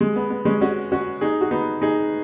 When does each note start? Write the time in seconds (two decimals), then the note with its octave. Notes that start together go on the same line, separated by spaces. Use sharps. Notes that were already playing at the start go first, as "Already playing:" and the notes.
0.01 G#3
0.16 B3
0.30 B3
0.45 G#3 C#4
0.61 C#4 F#4
0.92 C#4 F#4
1.21 D#4 G#4
1.41 F#4
1.51 B3 D#4
1.82 D#4 G#4